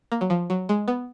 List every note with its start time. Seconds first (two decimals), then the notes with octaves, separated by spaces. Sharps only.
0.12 A#3
0.21 F#3
0.30 F3
0.50 F#3
0.69 G#3
0.88 B3